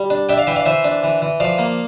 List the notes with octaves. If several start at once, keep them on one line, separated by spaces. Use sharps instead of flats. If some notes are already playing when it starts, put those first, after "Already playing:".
Already playing: G3
D4
D4 E5 G5
D5 F5
E3 E5 G5
D5 F5
E3 C5 E5
D4
E3
E3
F3 D5 F5
A#3